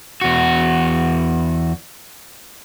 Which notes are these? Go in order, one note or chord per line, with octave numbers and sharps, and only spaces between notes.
E2 F#4